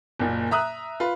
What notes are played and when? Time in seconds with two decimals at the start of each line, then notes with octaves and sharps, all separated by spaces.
0.19 F#1 A#2
0.51 E5 A#5 D#6 F#6
1.00 F4 B4